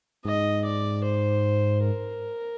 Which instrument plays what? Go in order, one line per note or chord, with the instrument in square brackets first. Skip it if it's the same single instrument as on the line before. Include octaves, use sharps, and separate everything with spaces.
[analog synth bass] G#2 [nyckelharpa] D#5
[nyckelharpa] D5
C5
A#4